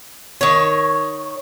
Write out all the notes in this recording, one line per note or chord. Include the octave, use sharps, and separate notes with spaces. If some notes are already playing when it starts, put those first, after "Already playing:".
D#3 C#5